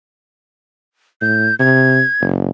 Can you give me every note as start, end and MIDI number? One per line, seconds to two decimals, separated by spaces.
1.22 1.49 45
1.22 1.55 91
1.59 2.02 48
1.59 2.24 92
2.21 2.50 30